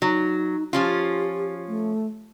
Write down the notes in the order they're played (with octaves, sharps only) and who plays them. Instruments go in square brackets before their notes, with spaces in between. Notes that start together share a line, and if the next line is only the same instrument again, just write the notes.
[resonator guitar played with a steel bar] F#3 [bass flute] D#4
[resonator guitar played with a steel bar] F3 C#4 F4 [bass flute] G4
[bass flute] A3